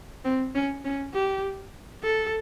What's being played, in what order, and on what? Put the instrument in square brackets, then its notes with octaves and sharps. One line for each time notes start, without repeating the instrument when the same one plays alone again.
[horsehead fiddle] C4
C#4
C#4
G4
A4